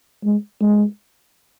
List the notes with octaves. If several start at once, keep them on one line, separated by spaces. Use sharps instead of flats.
G#3
G#3